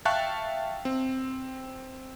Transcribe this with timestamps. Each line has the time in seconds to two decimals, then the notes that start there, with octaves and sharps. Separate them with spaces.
0.05 E5 F5 G5 A5 C#6 F#6
0.85 C4